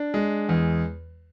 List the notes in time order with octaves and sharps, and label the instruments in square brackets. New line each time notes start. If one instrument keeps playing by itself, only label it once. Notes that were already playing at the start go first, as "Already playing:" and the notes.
Already playing: [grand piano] D4
G#3
E2